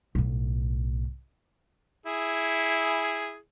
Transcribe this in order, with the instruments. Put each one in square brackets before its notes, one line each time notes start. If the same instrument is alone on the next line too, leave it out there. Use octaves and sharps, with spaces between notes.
[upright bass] B1 A2
[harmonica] E4 G#4